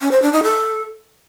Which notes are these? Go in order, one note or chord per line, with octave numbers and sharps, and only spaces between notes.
C#4
C5
D4
D#4
A4